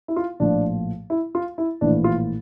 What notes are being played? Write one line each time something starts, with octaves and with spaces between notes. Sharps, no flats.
E4
F4
A#1 A2 F3 D4
E4
F4
E4
A#1 A2 E3 D4
F4